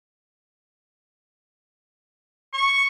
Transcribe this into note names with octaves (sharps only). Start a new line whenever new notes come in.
C#6